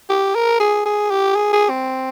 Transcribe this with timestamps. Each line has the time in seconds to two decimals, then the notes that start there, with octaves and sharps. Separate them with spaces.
0.09 G4
0.35 A#4
0.60 G#4
0.85 G#4
1.11 G4
1.36 G#4
1.53 G#4
1.69 C4